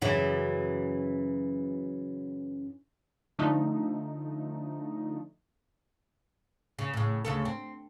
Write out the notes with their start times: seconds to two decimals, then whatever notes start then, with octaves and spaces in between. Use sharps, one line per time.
0.02 F#2 C#3 E3
3.39 D3 F3 A3 D#4
6.79 C#3
6.93 A2 C#3
7.25 D2 C#3 A4
7.45 C4